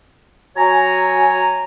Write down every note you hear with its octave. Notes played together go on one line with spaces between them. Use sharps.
F#3 C#5 G#5 A#5